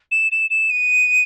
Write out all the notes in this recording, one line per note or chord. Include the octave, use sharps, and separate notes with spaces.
E7
E7
E7
D#7